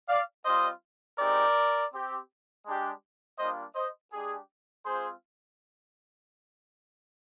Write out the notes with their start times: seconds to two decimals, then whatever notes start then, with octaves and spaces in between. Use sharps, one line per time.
0.09 D5 F5
0.45 G3 C4 F4 C5 D#5
1.18 G#3 C4 D#4 G4 A#4 D5
1.92 C4 G4
2.65 G#3 D4 G4
3.38 G3 A#3 D4 F4 C5 D#5
3.75 C5 D#5
4.12 G#3 D4 G4 G#4
4.86 G#3 C4 F4 G#4 C5